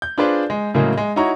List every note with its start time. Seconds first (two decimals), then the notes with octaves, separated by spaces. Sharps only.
0.02 G6
0.18 D4 F4 G#4 B4 C5 D5
0.50 G#3
0.74 A2 C#3 F#3 G#3 A#3
0.97 G#3
1.16 D#4 E4 F#4 C#5 A#5 C#6